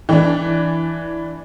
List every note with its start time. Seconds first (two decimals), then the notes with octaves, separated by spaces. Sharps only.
0.09 E3 D4